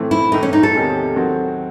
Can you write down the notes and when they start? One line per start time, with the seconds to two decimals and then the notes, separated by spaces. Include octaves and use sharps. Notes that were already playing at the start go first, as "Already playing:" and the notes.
Already playing: A2 E3 A3 C4
0.11 E4
0.32 A2 E3 A3 D#4
0.43 C#4
0.53 D#4
0.63 A4
0.74 E2 C3 D#3 G#3 C#4
1.16 D#3 F#3 C4 F#4